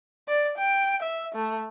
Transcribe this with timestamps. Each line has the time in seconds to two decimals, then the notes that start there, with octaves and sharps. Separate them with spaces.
0.28 D5
0.58 G5
1.02 E5
1.35 A3